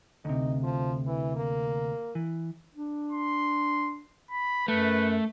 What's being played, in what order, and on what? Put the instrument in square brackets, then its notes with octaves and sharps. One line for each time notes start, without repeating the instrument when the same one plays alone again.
[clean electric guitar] D2 C3 [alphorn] D#4
[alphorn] F3
E3
A#3
[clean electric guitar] E3
[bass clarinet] D4
[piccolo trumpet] C6
B5
[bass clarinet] F#2 [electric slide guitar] A3 [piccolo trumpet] B4